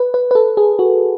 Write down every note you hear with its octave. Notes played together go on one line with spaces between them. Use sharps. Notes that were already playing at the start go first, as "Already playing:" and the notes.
Already playing: B4
B4
B4
A4
G#4
F#4